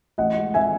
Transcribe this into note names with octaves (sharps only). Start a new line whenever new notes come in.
A1 D#5 F#5
G#3
C4 E5 G#5